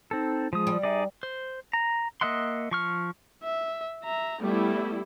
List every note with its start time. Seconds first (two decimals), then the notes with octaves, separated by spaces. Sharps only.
0.11 C4 D#4 A4
0.53 F3 G#3 D#6
0.67 G3
0.83 D#4 G#4 D5 E5
1.23 C5
1.73 A#5
2.21 A#3 D#5 E5 F#5 C6
2.71 F3 C#6 F6
3.43 E5
4.03 E5 A#5
4.41 G3 A3 B3 E4